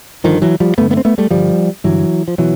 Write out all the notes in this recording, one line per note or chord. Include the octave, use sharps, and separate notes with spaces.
G2 D3 D#3 F3
E3 F#3
F3 G3
G2 D3 A3 B3
A3 B3
C4
A3 B3
G3 A3
G2 D3 F3 G3
G2 D3 E3 F#3
F3
B2 E3 F#3